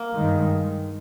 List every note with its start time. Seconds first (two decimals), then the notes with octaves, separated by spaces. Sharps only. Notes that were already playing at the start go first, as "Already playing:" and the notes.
Already playing: A#3
0.14 G2 D#3 G#3